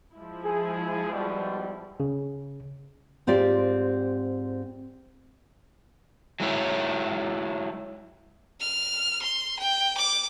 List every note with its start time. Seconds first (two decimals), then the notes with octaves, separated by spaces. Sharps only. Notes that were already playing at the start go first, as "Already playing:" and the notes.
0.13 F3 G#3 E4
0.44 G#4
1.11 G#2 B2 G3
2.00 C#3
3.27 G#2 C4 F4 G4 D5
6.40 F#3 G#3 E4 C#5
8.60 F6
9.22 C6
9.59 G5
9.97 D6